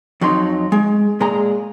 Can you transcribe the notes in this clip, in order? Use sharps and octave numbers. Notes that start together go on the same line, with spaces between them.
F2 F#3 D#4 C6
G#3
A#2 G#3 G#4 A#5